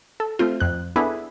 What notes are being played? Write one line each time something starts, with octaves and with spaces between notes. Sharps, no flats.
A4
A3 C4 F4
F2 F#6
B3 D4 E4 G#4 A4 B4